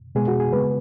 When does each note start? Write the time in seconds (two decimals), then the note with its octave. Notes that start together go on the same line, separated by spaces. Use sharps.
0.15 B2 G#3 B3 G#4
0.28 F#4
0.40 G#4
0.52 C#3 G#3 B3 B4